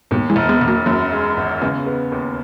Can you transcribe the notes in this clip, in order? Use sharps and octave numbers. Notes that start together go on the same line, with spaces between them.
D#2 G#2 B2
E3 G#3
E1
G#3 B3
E1
F#3 A#3
F#2 F#3 A#3
G#3
G#1
C#3 G#3 B3
B3
D#2